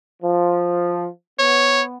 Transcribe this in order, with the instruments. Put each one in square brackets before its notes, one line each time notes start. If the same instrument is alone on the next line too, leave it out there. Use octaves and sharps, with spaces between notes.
[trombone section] F3
[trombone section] B3 [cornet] C#5